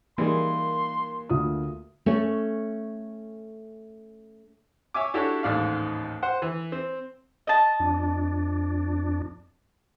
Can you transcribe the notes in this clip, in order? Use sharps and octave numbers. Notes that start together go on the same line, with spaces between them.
E3 G3 A#3 D#4 G#4 C6
D2 F4 D#6
A3 C#4
C#5 E5 G#5 D6
D4 E4 F#4 G4 A4 C#5
A1 D#2 G#2 D5 F5
C5 F#5
E3
C4
D#5 A5
F2 D4